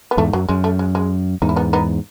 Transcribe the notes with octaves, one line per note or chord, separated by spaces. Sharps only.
B3
E2 G#2 A3
F#2 F#3
F#2 G#3
A3
G#3
G#3
E2 G#2 D#4
E4
B3 D#4
B3 D#4